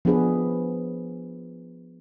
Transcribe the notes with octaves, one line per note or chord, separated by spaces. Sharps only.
F3 B3 D4 G#4 B4